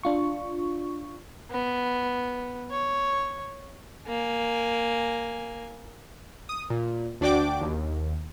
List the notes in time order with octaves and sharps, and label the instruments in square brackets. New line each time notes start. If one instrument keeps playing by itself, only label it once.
[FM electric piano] D4 F4 C#6
[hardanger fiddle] B3
C#5
A#3 G#5
[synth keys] D#6
A#2
D2 D4 F#4 D5 G5 D6
D#2